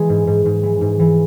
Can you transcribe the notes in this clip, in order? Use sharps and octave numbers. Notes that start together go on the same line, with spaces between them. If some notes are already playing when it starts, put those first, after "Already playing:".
Already playing: E3 G#3
G#2
G#2
G#2
E3
G#2
E3